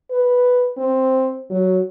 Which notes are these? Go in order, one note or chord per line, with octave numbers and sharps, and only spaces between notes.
B4
C4
F#3